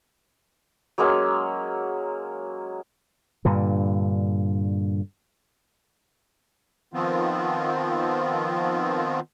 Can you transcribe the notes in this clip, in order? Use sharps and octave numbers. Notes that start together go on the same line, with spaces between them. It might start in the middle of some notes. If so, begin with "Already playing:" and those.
F#3 G#3 A#3 C#4
G2 A#2 D3
D#3 F3 B3 C4 F4